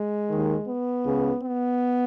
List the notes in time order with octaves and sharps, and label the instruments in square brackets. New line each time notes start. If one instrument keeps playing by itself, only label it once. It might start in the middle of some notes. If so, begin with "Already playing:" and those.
Already playing: [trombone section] G#3
D#2 D#3
B3
C#2 C#3
B3